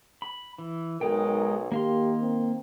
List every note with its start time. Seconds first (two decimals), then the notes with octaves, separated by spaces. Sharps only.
0.22 B5
0.58 E3
1.01 B1 G#3 D#4 A#4 G5
1.72 D#3 A#3 G4 F5 C6
2.22 C4